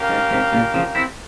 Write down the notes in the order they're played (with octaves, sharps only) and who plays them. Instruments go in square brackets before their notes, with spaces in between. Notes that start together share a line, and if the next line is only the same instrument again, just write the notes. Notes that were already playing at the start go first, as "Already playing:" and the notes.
Already playing: [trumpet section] C#4 G4 A#4 F5
[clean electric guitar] G#2
G#2 C3
A#2 C#3
C#3 F3
C4 E4